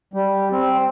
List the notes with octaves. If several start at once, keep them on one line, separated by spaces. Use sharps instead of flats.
G3
C4